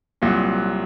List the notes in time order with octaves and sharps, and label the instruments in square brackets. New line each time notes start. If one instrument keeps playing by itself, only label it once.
[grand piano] C2 A#2 F#3